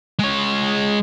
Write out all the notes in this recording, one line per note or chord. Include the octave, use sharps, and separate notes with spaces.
G#3 C#5